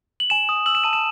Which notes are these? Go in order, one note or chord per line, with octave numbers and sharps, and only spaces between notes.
F#7
G#5 E7
D#6
E6 F#7
E7
A5 D#7
E7